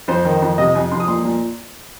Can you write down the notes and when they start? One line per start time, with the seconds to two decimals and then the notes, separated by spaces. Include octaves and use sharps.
0.08 F2 C5
0.25 D#3
0.42 F2
0.58 C3 D#5
0.75 F2 G#5
0.92 F2 C6
1.00 D#6
1.08 A#2 C6
1.25 A#2